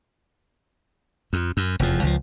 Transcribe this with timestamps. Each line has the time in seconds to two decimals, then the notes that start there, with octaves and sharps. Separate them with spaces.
1.33 F2
1.57 F#2
1.79 F1 E2 F3
2.03 C#2 E3 F3